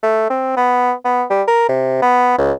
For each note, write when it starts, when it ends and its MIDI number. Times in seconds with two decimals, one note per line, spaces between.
0.03 0.30 57
0.30 0.53 60
0.57 0.93 59
1.05 1.24 59
1.30 1.43 55
1.47 1.66 70
1.69 1.97 48
2.02 2.36 59
2.38 2.52 37